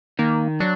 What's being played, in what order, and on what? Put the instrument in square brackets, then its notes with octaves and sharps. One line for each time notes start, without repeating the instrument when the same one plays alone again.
[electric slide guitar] D#3 [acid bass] A#3
[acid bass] F#3 [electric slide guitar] D4